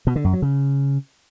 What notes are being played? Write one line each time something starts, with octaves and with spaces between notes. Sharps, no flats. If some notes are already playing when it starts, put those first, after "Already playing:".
B2
D3
F#2
F#3
C#3